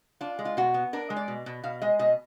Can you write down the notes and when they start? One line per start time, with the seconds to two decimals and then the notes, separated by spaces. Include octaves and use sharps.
0.21 D4 F4
0.39 G#3
0.45 F4
0.57 B2 F#4
0.74 B3
0.93 D4 A#4
1.10 G#3
1.16 D5
1.28 B2
1.46 B2
1.63 B2 F5
1.82 G#3 D#5
1.99 B2 D#5